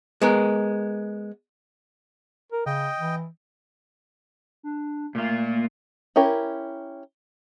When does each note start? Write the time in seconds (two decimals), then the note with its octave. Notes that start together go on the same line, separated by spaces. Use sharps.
0.22 G#3 B3 A#4
2.52 A#4
2.66 C#3 D#5 G5
3.00 E3
4.63 D4
5.15 A#2 A3 F4
6.16 C#4 E4 G4 A#4